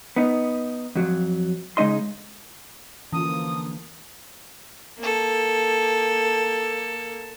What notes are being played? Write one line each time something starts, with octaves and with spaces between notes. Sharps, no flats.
B3 D#4
F2 F#3
C#3 G#3 D#4 D#5 C6
D3 E3 F3 A#3 C#4 F4 D#6
A#3 A4